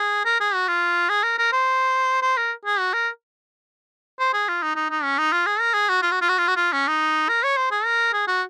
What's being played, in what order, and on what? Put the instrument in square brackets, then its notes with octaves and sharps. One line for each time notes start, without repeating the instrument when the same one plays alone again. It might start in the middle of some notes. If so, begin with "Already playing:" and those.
Already playing: [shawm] G#4
A#4
G#4
F#4
F4
G#4
A#4
A#4
C5
C5
A#4
G#4
F#4
A#4
C5
G#4
F4
D#4
D#4
D#4
C#4
D#4
F4
G#4
A#4
G#4
F#4
F4
F#4
F4
F#4
F4
F#4
F4
C#4
D#4
A#4
C#5
C5
G#4
A#4
G#4
F#4